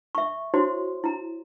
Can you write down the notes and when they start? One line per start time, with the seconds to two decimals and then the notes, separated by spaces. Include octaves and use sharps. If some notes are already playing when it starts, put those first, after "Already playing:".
0.15 E5 C#6
0.54 E4 F#4 C5 C#5 C6
1.04 E4 A#5